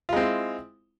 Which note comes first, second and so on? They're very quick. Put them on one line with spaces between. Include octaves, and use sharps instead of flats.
F4 G#3 C4 E4